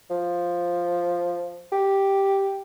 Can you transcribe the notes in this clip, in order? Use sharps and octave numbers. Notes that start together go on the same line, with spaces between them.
F3
G4